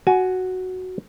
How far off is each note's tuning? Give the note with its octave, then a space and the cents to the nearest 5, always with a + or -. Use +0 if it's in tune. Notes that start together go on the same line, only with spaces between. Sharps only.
F#4 +0 G#5 +20